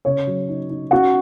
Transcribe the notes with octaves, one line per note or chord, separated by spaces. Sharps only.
C#3 C#5
F#3
D#4
D#4
C#4 F#4 F#5